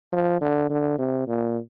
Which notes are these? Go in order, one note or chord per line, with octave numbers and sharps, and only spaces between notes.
F3
D3
D3
C3
A#2